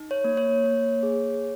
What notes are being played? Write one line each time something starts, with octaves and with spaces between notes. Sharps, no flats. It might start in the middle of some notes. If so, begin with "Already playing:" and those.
Already playing: D#4
C#5
A#3
C#5
A#3
G#4